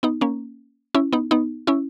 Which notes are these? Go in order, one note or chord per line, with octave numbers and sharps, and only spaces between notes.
B3 D#4
A#3 C#4
C#4 E4
B3 D#4
B3 D#4
C#4 E4